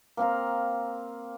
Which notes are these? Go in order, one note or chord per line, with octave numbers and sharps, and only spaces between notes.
A#3 C4 F5 A#5